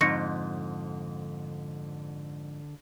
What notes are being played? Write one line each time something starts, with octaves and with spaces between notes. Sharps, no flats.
F2 G#2 D3 C#6 A#6 C#7